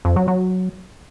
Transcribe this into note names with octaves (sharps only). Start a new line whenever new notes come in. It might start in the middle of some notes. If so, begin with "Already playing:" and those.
F2
F#3
F#3